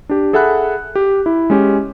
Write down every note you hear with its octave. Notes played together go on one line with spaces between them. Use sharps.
D4 G4
G#4 A4 E5 F#5 B5 F#6
G4
E4
G#3 C#4 G4